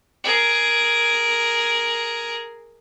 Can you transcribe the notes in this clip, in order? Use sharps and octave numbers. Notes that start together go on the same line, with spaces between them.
G#4 A#4